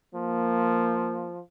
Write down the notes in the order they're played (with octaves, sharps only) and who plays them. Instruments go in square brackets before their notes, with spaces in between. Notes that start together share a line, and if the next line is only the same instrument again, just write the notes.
[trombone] F3 [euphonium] A#3